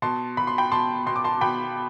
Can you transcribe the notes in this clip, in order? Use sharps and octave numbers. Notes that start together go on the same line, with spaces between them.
B2 A5 C6
B2 B5
C6
G5 B5
B2 A5 C6
B2 C6
D6
A5 C6
B2 G5 B5